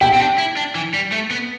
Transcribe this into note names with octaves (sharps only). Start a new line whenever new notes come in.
E4 G5
C4
D4
E4
D4
E3
G3
A3
B3